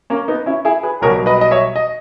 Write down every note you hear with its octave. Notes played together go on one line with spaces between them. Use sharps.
A#3 C#4
B3 D#4
C#4 E4
E4 G#4
G#4 B4
B1 B2 G3 A#4 C#5
B4 D#5
D#5
C#5 E5
D#5